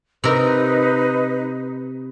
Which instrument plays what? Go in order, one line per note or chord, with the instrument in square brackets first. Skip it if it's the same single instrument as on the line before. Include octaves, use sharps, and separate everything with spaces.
[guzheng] C3 A#4 [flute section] D#4 B4